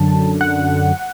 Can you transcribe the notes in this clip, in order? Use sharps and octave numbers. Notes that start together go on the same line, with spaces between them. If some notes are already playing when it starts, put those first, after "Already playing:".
Already playing: F#2 D3 F#3 A5
F#5